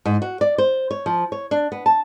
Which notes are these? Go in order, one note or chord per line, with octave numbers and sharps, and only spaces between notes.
G#2
F#4
D5
C5
C#5
F3
C#5
D4
B3
A5